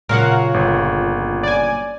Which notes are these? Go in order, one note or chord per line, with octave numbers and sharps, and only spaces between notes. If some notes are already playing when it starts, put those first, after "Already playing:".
A#2 C#3 F#3 A#4 F5 F#5
G1
D5 G#5